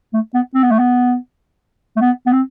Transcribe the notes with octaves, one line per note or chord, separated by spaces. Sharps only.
A3
B3
C4
B3
A3
B3
A3
B3
B3
C4